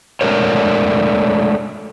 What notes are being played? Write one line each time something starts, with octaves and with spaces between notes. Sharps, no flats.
G#3 A3 D4 A#4 C#5